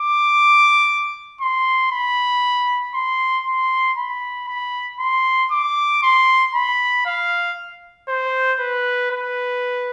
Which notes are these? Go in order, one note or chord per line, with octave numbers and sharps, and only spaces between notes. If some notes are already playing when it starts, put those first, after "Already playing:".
Already playing: D6
C6
B5
C6
C6
B5
B5
C6
D6
C6
B5
F5
C5
B4
B4